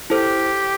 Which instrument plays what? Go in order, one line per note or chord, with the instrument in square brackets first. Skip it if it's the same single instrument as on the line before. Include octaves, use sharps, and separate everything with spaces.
[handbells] E4 A4 C5 [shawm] G4